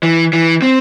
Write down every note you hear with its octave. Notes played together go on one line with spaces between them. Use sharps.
E3
E3
C4